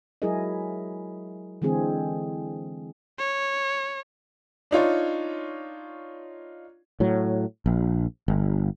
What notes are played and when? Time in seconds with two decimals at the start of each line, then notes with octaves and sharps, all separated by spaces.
0.22 F#3 G#3 E4 G#4 A#4 D#5
1.62 D3 E3 G#3 C4 G#4
3.18 C#5
4.71 D4 D#4 F4 C#5
7.00 A2 F#3
7.66 A#1
8.28 G1